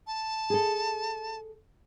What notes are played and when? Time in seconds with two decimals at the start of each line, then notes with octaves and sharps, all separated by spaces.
0.07 A5
0.50 G#4 A4